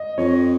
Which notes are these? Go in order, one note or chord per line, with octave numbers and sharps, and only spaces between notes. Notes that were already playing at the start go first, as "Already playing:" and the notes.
Already playing: D#5
F2 C#5